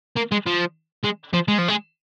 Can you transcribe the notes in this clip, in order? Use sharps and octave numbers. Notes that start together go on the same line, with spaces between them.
A#3
G#3
F3
G#3
F3
G#3
F3
G#3